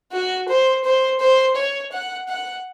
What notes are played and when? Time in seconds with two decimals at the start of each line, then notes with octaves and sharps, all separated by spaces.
0.12 F#4
0.48 C5
0.84 C5
1.20 C5
1.56 C#5
1.92 F#5
2.29 F#5